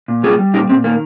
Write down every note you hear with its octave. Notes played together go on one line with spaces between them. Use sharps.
A#2
G3 F4 G#4
G3
A#2 D#4 G4
A#2 C4
D#3 A#3